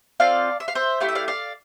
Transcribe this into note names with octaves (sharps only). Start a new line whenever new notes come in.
C4 F4 A4 D5 F5
E5
F5
C5 E5
A3 E4 G4 F5
E5
D5 F5
D5 F5